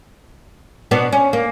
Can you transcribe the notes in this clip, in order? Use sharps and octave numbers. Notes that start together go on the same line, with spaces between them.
B2 B3 D4
C#4
A#3